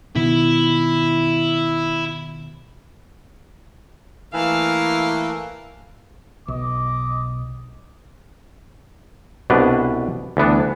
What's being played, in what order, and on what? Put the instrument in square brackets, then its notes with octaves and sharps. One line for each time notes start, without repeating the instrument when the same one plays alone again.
[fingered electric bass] B2 D#3 B3 [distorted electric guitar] E4
[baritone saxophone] E3 [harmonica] A3 A#3 A4 [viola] F5
[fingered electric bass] B1 [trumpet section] D#5 D6
[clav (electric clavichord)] C2 B2 D4 B4
D2 E3 B3 D4